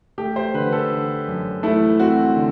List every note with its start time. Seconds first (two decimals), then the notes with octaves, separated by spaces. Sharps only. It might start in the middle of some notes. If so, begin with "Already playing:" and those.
0.18 A3 G4
0.36 C5
0.54 D3 B4
0.73 A4
0.91 D3
1.27 F#2
1.63 A3 E4
2.00 C4 F#4
2.36 D3